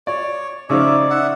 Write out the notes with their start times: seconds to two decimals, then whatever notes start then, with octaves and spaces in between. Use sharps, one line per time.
0.07 C#5 D5
0.70 C#3 F3 D#4 C#5 D5 E5
1.10 E5 F#5